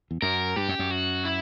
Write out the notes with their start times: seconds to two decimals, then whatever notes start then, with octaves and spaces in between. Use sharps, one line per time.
0.11 E2
0.22 F#2 A#4
0.56 G2 G4
0.69 F#2
0.79 F#2
0.91 F#4
1.25 E4